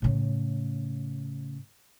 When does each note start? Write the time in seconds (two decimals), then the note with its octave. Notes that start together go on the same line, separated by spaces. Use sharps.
0.02 A2 C#3